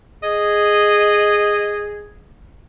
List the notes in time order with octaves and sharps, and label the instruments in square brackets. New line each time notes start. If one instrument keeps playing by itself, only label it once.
[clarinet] G#4 [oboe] D#5